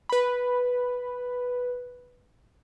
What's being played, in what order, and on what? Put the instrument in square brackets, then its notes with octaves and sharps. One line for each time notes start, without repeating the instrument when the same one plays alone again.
[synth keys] B4 B5